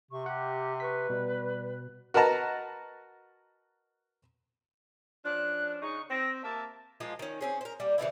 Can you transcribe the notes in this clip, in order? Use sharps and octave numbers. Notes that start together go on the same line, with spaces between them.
C3 C#6
G4 F#5
B4 C#6 B6
B2 G3
F#4 A#4 B4 D#5 A5 A#5
F3 C#4 D4 F#6
C#3 D#4 C#6
C4 A#6
A#3 G4 E5 A5
F3 G#3 A#3 F4
D#3 C#4
C4 C#4 G#4
A#4 C5
G3 A#3
C#3 E3 F3 E4